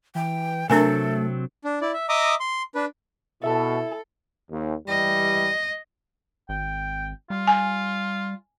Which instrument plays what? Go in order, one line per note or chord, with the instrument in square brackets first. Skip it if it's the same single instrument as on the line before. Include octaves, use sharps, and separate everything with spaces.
[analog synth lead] E3 [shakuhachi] G5
[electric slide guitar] C3 F#3 C4 [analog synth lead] A3 [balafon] D4 A#4 G#5 [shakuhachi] A4
[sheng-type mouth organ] D4
E4 D5
E5
D#5 E5 A#5 D6 D#6
C6
D4 B4
[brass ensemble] B2 [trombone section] E4 [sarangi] A4 [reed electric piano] E5 A5
[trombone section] D#2
[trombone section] E3 G3 [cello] D#5
[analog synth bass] G#1 [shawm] G5
[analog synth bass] G3 [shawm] F4
[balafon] G#5